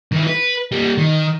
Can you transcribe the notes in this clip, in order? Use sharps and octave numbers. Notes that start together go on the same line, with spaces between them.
D#3 E4
B4
G3 A#3
D#3